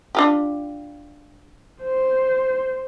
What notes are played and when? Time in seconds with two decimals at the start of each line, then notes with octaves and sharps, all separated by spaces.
0.15 D4 F4 G4
1.82 C5